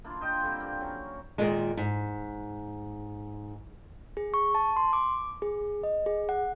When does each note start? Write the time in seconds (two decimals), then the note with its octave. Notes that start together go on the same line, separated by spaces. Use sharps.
0.04 A#3 D4 E4 F4
0.20 C5 D#5 G5 A#5
0.43 D3 G3 C4
0.60 A#3 G4
0.81 F#3 C#4
1.38 A#2 D#3 G#3
1.77 G#2
4.17 G#4
4.34 C#6
4.55 A5
4.77 C6
4.93 D6
5.42 G#4
5.83 D#5
6.06 G#4
6.29 F#5